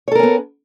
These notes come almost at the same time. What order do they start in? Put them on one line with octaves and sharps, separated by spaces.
C#5 A4 A#4 C#4 B3